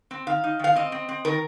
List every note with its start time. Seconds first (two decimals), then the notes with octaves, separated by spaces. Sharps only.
0.11 C4
0.27 D#3 F5
0.44 D#4
0.59 D#3 F5
0.75 C4 D#5
0.92 C4
1.09 C4
1.25 D#3 A#4